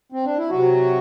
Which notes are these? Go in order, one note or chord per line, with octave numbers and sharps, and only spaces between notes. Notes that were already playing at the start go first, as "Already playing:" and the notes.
C4
D4
E4
C3 F#3 F#4